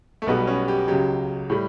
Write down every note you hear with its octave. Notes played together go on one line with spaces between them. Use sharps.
A3
B1 B2 G3 B3
C#4
G4
C#2 C#3 F#3 G4
A2 G3